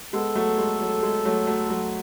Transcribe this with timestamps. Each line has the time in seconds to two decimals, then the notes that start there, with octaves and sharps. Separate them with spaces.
0.13 G#3 B3 A4
0.35 F#3 A3
0.58 G#3
0.80 F#3
1.03 G#3
1.25 F#3 A3
1.47 F#3 A3
1.70 F#3